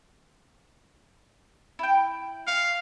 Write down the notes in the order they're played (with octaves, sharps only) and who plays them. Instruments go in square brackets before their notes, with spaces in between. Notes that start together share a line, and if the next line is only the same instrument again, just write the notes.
[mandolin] E4 G5
[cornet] F5 [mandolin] C#6